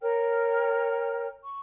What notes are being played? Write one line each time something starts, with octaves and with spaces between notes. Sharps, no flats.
A#4 C#5 G5 F6
C#6